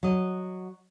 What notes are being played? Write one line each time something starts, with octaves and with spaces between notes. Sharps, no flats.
F#3 D#5